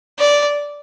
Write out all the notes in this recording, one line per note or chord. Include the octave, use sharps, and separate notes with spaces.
D5